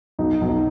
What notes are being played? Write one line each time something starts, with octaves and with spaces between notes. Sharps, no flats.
B1 D#4
B1
D#4